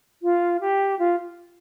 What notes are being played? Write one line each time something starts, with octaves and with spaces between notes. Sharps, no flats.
F4
G4
F4